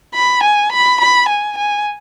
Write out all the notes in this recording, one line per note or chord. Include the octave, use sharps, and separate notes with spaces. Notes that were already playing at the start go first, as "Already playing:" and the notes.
B5
G#5
B5
B5
G#5
G#5